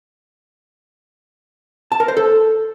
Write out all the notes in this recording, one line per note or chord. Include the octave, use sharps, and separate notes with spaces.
A5
A#4
C5
A4